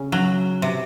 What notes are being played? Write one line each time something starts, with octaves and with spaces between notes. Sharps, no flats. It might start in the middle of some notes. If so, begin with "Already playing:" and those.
Already playing: C#3 C#4
F#3
C3